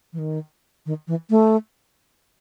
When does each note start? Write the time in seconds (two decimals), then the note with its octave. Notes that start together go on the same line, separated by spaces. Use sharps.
0.13 E3
0.19 D#3
0.86 D#3
1.08 E3
1.30 A3